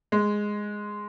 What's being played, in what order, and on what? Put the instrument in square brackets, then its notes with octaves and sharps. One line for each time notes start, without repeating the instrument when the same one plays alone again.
[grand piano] G#3